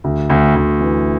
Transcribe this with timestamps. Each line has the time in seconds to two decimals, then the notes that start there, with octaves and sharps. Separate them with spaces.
0.04 D2
0.30 D2
0.55 D2
0.80 E3